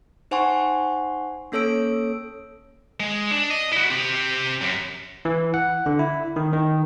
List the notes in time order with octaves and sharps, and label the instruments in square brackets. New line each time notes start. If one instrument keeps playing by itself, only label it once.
[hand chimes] D#4 C5 F#5 G#5 C6 C#6
A#3 C#4 A4 C#5 E6 D7
[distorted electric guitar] G#3
D4
D#5
E4 F#4
C4 G4
F#2
[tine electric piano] E3
F#5
D3
E4
D#3
D#3